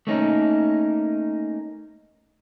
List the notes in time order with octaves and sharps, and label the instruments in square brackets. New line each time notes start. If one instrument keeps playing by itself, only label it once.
[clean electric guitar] A3 A#3 C#4 D#4